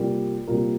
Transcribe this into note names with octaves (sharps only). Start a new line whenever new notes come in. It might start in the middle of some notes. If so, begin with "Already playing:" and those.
Already playing: C3 G3 A#3 F4 A#4
C3 G3 A#3 F4 A#4